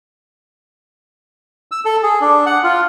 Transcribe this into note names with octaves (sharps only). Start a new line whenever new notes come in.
E6
A4
G#4
D4
F#5
F4